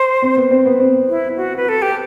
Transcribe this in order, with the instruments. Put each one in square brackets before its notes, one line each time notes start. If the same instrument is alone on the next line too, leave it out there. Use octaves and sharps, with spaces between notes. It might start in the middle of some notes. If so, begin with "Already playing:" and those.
Already playing: [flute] C5
[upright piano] C4
B3
C4
B3
C4
[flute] E4
F#4
B4
A4
G4